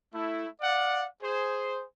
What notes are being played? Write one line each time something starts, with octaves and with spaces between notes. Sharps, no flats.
A3 E4
D5 F5 F#5
G#4 C5